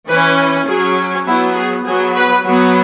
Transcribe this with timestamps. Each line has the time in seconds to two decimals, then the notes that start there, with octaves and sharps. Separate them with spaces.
0.08 E3 C#4 B4
0.67 F#3 C#4 G#4
1.27 F#3 B3 E4
1.56 G#4
1.85 F#3 B3 G#4
2.15 B4
2.45 F#3 B3